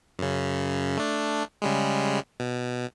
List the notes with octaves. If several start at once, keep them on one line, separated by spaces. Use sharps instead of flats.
F#2 C#3
A3 D4
C#3 G3 G#3
B2